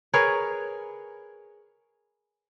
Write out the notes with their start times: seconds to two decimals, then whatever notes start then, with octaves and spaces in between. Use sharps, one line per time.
0.13 G#4 A#4 B4 C#5